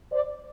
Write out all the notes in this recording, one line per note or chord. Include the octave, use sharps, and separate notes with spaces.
C5 D5